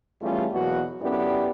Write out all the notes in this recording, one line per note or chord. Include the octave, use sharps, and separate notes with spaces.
E2 G3 A3 C#4 F4 G#4
E2 B2 F#3 A#3 F#4
F#2 B3 E4 G4 A4 D5